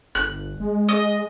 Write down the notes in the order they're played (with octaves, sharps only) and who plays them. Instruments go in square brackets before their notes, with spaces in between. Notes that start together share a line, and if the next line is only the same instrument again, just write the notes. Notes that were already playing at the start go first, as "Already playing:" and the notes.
[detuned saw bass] G1 [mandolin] F#6
[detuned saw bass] G#3
[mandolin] D#5